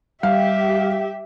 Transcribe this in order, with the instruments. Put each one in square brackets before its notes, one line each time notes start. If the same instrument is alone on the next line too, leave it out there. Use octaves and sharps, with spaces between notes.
[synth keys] G3 [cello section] G4 [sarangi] E5 [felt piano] F5